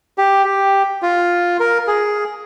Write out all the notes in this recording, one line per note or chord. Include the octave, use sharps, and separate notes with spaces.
G4
G4
F4
A#4
G#4